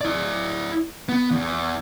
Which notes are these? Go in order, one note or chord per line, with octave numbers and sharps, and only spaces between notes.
E4 D5
B3
E2